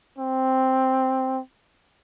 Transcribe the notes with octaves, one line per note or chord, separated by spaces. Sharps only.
C4